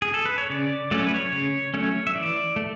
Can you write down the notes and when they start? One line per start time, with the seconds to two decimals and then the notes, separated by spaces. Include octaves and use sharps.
0.02 G#4
0.14 A4
0.26 B4
0.38 C#5
0.50 C#3 D5
0.91 F#3 A3 C#4 D5
0.99 C#5
1.07 B4
1.14 C#5
1.32 C#3 C#5
1.74 F#3 A3 C#4 C#5
2.07 E5
2.15 E3 D5
2.56 A3